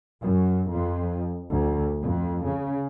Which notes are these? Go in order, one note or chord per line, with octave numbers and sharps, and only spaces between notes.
F#2
F2
D2
F2
C#3